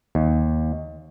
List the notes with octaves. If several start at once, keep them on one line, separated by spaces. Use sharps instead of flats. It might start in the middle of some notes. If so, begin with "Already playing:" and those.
D#2